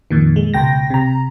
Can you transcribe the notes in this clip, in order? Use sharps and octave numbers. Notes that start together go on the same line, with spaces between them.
F2 A#2 D#3
G#3
C#2 B2 G5 A#6
C3 A#5